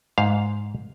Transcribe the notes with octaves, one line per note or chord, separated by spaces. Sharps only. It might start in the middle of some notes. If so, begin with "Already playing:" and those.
G#2 F5